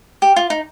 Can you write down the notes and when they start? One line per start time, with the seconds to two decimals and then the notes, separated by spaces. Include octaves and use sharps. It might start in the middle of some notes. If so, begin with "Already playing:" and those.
0.22 G4
0.36 F4
0.50 D#4